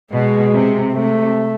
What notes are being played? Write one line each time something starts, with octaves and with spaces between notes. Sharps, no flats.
B2 G#3
C3
C3 A3